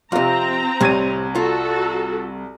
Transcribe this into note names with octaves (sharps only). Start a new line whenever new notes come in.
F2 C3 C4 F4 A#5
C2 A2 C3 G#6 D#7
F4 F#4 A4